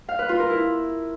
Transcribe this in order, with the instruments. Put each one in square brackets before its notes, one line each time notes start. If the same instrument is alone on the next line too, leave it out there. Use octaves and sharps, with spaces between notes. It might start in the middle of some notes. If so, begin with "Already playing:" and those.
[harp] F5
B4
F4
A#4
E4